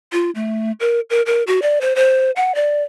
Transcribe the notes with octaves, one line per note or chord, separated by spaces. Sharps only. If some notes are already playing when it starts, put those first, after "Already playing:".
F4
A3
A#4
A#4
A#4
F#4
D5
C5
C5
F#5
D5